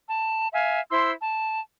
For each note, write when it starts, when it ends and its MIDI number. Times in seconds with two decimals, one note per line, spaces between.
0.11 0.47 81
0.53 0.80 76
0.53 0.80 77
0.53 0.80 80
0.91 1.11 64
0.91 1.11 72
0.91 1.11 84
0.91 1.11 88
1.22 1.60 81